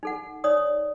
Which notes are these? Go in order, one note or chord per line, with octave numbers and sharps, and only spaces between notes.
D#4 A4 F#5
D#4 C#5 D5 D#6